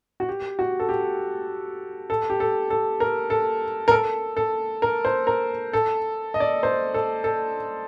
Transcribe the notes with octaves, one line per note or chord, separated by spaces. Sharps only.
F#4
G4
F#4
A4
G4
A4
G4
A4
A4
A#4
A4
A#4
A4
A4
A#4
C5
A#4
A4
D#5
D5
C5
A4
A4